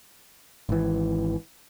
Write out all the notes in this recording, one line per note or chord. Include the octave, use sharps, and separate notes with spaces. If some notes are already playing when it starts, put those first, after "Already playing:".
G#1 E3